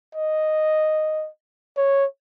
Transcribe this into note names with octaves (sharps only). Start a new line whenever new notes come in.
D#5
C#5